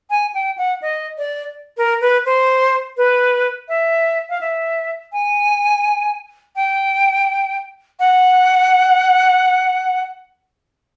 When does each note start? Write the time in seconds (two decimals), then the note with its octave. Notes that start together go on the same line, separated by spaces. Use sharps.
0.10 G#5
0.34 G5
0.58 F#5
0.82 D#5
1.18 D5
1.77 A#4
2.01 B4
2.26 C5
2.97 B4
3.69 E5
4.30 F5
4.41 E5
5.13 G#5
6.56 G5
8.00 F#5